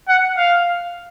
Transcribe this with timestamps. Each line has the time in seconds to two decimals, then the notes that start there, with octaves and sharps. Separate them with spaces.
0.08 F#5
0.37 F5